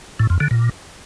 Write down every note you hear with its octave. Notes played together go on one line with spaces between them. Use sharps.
A2
F2
D3
A#2